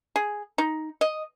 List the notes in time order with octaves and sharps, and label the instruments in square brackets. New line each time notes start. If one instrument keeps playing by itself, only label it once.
[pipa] G#4
D#4
D#5